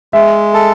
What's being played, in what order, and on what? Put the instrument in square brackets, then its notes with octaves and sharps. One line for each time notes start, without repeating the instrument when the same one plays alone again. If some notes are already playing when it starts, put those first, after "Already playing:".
[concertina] G#3 [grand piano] E5
[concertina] A4